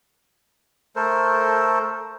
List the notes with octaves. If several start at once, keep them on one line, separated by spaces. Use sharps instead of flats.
A3 A4 A#4 C5